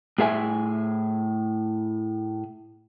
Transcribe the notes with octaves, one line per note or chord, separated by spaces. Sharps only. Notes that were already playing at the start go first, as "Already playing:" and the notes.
A2 G#4 E5 G#5